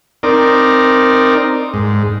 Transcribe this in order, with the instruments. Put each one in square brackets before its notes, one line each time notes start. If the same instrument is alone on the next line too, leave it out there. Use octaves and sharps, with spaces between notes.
[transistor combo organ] C4 D#4 A#4 D5
G#2